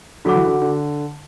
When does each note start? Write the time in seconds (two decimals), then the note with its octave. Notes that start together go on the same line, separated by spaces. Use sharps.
0.25 D3 F#3 F#4 A4 F#5 D6
0.35 E3
0.46 D3
0.62 D3